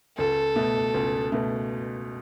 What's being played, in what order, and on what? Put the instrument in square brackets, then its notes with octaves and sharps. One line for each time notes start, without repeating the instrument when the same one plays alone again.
[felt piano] C#2 [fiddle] A4
[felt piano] B2 A3
C#2
B2 A3